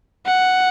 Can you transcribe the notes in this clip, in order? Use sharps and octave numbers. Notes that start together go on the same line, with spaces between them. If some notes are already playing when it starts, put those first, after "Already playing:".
F#5